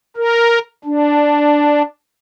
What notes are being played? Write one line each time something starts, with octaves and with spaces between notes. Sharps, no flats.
A#4
D4